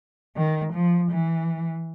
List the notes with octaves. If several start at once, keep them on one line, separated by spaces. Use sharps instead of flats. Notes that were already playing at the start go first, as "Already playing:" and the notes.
D#3
F3
E3